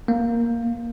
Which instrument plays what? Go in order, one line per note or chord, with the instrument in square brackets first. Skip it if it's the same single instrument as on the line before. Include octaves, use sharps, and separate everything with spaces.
[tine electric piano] A#3